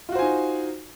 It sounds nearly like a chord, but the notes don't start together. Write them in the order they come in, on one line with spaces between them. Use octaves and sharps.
F4 F#4 C5 G#5 D#4